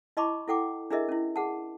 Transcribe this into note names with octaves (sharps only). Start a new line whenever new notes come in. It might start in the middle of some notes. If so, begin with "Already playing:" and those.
E4 D#5 A5 B5 C#6 D6
E4 A4 F#5 G5 D6
D4 E4 G#4 A#4 D#5 E5
C#4 E4
G#4 F#5 A5